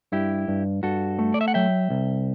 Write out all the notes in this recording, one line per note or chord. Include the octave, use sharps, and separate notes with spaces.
G2 E4 G4
G2
G2 F#4 A4
A3
D5
E5
F#5
F#3 E5 G5
C2